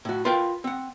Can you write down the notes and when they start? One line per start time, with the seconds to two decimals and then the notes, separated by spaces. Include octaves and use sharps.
0.05 A2 F#4
0.25 F4 A#4 B4 F5 G5
0.64 C4 F#5